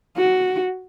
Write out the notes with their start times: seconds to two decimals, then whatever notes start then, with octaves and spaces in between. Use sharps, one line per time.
0.17 F#4